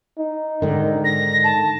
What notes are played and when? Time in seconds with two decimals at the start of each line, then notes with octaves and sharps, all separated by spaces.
0.19 D#4
0.62 G#2 D3 D#3
1.04 A#6
1.44 A5